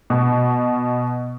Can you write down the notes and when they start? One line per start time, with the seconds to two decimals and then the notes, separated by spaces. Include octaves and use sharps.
0.10 B2